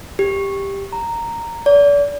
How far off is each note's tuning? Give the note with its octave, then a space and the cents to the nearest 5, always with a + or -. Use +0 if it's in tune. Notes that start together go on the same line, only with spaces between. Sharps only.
G4 +10
A#5 -10
D5 -40